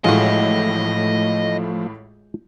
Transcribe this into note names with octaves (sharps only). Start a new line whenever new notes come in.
A1 A2 F3 G#3 A3 F4 F#4 D#5